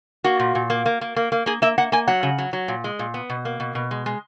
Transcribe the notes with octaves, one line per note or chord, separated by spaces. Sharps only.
A#3 F#4
A#2
A#2
A#3
A#3
A#3
A#3
A#3
A#3 G#4
A#3 E5
A#3 F#5
A#3 G#5
F#3 F#5
C#3
F#3
F#3
A#2
G#3
A#2
B3
B2
A#3
B2
B2
G#3
G#3